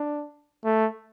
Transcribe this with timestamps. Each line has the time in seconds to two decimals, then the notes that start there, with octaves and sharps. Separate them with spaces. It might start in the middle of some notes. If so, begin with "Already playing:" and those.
Already playing: D4
0.65 A3